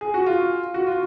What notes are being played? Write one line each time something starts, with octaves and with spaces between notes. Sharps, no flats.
G#4
F#4
F4
F#4
F4